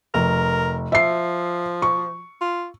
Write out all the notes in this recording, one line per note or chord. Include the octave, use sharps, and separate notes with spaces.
F1 A#4
F3 E5 C7
C#6
F4